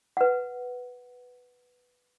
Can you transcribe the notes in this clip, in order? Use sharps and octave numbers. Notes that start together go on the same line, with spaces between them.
B4 F#5